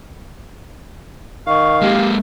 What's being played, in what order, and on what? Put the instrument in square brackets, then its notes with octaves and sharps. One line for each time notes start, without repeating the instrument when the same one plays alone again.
[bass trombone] D#3 [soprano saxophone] F5 [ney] C#6
[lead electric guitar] G#3 A#3 [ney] G4